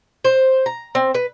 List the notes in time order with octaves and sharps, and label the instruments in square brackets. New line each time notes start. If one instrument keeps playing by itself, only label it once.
[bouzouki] C5
A#5
C4
B4